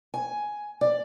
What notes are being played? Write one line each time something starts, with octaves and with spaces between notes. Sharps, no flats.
G#5
D5